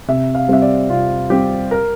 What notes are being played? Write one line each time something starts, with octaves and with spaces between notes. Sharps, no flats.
C3 E5
F5
G3 C4 E5
D5
C3 F4
G3 C4 G4
A#4